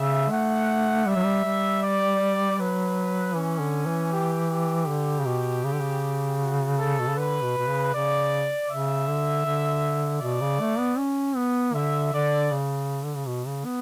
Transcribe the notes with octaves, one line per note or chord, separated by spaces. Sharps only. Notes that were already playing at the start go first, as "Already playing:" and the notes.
Already playing: C#3 E5
A3 F#5
G3 E5
F#3
G3
G3
D5
F#3 B4
E3 C#4
D3
E3
G4
G4
D3
C#3
B2
C#3
D3
C#3
F#4
A4
B2
C#3
D3 B4
B2
B2
C#3
C#3 D5
C#3 E5
D3
D3
B2 D5
C#3
A3
B3
C#4
B3
D3 E5
D3 D5
C#3
D3
C#3
B2
C#3
B3